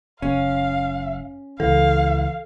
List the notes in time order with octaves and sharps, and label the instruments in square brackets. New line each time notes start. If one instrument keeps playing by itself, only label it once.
[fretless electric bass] F#1 [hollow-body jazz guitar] C#4 [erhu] F5
[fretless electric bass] C#2 E3 [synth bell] A4 [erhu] F5